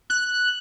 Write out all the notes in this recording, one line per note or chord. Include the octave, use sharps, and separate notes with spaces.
F#6